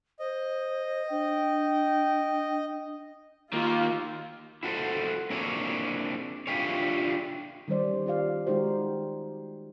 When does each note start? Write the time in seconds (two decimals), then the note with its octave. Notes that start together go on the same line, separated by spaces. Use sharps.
0.19 C5 D#5
1.10 D4 G5
3.53 D#3 A#3 F4
4.63 E4 F#4 A4 C5
5.30 A#3 C4 D4 E4 G#4 C#5
6.47 D4 E4 F4 G4 G#4 C#5
7.68 D#3 G3 C#4 C5 D5
8.06 F4 G4 D5 F5
8.47 D#3 G#3 D#4 F#4 G4 C5